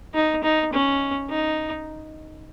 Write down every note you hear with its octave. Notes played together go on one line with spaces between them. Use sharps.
D#4
D#4
C#4
D#4